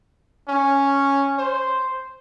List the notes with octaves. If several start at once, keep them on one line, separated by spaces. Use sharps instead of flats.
C#4
C5